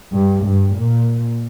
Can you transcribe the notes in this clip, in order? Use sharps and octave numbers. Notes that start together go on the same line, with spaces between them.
G2
G2
A#2